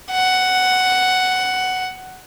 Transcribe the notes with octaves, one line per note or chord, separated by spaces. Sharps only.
F#5